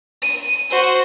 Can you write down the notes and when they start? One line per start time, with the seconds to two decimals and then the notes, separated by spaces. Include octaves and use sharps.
0.22 D#7
0.71 F#4 C5